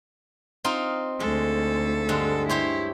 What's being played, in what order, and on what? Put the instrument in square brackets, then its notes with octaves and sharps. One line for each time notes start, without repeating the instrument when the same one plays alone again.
[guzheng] C4 D#4 F4
[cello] D2 A4 [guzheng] G#3
[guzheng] G2 D3 G#3
[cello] E4 [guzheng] G4 C5 C#5